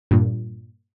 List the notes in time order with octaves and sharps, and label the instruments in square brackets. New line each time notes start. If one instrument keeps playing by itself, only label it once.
[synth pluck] G2 A#2